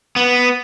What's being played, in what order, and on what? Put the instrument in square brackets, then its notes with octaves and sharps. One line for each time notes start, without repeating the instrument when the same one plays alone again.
[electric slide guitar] B3